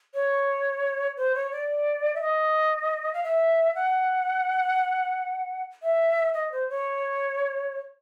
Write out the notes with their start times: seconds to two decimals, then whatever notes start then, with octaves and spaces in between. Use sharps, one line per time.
0.14 C#5
1.17 C5
1.35 C#5
1.52 D5
2.15 E5
2.21 D#5
3.14 F5
3.24 E5
3.75 F#5
5.83 E5
6.34 D#5
6.52 C5
6.69 C#5